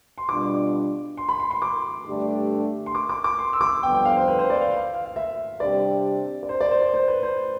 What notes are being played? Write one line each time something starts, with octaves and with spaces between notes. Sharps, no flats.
C6
B2 G3 D4 F4 D6
C6
B5
C6
C6
D6
G2 D3 A3 D4 G4
C6
D6
D6
D6
C6
E6
D6
F2 D3 G3 B3 G5
G5
F5
C5
B4
C5
D5
F5
F5
F5
F5
E5
C3 G3 D4 G4 D5
D5
C5
D5
C5
D5
C5
B4
C5